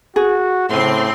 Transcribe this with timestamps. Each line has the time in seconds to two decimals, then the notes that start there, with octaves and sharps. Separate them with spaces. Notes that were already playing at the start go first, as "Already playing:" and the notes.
0.16 F#4 G#4
0.70 A2 C#3 C4 C6